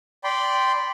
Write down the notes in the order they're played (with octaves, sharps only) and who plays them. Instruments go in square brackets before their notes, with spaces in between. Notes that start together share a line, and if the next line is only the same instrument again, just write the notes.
[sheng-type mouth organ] D5 G5 B5 C6